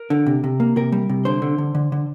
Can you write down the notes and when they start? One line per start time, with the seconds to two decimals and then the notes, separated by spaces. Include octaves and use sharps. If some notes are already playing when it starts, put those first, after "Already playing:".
Already playing: A#4
0.10 D3
0.26 C3
0.44 C3
0.60 A#3
0.76 C3 A#4
0.92 G3
1.09 C3
1.25 D3 C5
1.42 D3
1.58 D3
1.75 D3
1.92 D3